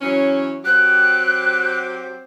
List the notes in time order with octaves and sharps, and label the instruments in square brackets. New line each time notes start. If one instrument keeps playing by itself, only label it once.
[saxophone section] E3 F#3 C#4
[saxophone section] F#3 C4 G4 [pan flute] F#6